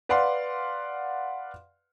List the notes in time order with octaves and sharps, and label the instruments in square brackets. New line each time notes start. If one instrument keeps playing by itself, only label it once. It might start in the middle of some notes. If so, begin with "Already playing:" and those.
[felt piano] B4 D5 F5 F#5 C6